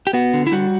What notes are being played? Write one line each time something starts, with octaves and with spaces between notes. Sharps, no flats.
G4
B3 F#4
D3
E4
G3 F#4